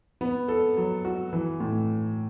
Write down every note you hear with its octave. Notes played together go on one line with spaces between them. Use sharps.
B3
A4
F#3
F#4
E3
A2